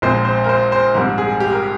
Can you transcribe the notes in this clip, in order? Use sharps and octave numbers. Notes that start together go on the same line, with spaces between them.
A#1 A#2 G#3 C4 C5
C5
A#4
C5
C5
A#1 G#2 G3 C4 A#4
G#4
G4
A#4